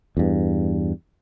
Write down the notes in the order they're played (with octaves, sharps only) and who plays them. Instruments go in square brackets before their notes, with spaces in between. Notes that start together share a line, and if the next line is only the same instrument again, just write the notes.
[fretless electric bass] E2 G2